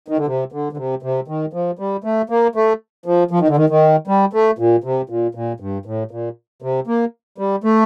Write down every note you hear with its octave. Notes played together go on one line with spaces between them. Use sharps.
D#3
D3
C3
D3
D3
C3
C3
D#3
F3
G3
A3
A#3
A3
F3
F3
D#3
D3
D#3
D#3
G3
A3
A#2
C3
A#2
A#2
G2
A2
A#2
C3
A#3
G3
A3